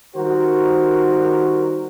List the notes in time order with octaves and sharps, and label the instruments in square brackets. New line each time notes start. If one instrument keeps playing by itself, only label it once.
[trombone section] D#3 G3 F#4 A#4 C5